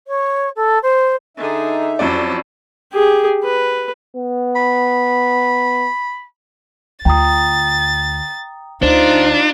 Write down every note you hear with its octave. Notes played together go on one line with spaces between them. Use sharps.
C#5
A4
C5
D3 D#4 G#4 E5
F2 F#3 C#4 E4 D5
G4 G#4
B4
B3
B5
D2 F4 G5 A#5 D#6 A6
D2 D4 D#4 F4 C5